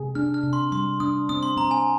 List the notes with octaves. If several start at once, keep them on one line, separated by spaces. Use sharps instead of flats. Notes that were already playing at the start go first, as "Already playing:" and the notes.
Already playing: C3 G#4
D4 F6
F6
C3
C6
G3 C6
D4 D#6
C4 D#6
C6
C4 A#5
G#5